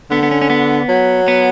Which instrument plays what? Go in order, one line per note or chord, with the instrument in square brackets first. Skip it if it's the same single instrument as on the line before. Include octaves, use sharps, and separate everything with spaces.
[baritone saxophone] D3 [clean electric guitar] B3
[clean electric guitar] B3
C#4
C#4
B3
[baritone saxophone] F#3
[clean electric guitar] B3